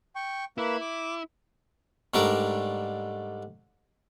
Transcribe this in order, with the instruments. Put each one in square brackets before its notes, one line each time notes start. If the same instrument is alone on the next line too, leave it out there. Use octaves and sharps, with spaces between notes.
[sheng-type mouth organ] G5 C#6
[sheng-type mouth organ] A#3 B4 [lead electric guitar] E4
[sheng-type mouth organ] D6
[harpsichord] G#2 G3 A3 D4 A#4